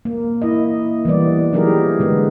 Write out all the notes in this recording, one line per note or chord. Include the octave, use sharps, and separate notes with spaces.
A#3
E4 D#5
E3 G3 B3 D5
F#3 D#4 E4 G4 G#4 A#4
D3 G#3 B3